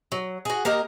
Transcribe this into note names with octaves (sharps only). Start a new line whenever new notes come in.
F#3
F#4 G#4
A#3 G4 A#4 D#5